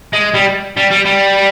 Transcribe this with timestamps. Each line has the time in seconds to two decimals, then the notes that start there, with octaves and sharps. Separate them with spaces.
0.13 G#3
0.34 G3
0.77 G3
0.91 G3
1.05 G3